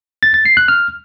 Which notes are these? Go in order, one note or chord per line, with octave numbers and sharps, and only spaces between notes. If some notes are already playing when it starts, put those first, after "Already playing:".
A6
A6
C7
F#6
F6